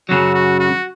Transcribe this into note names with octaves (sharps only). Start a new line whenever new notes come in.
F#2 C#3 F#3 F#4
F#4
F#4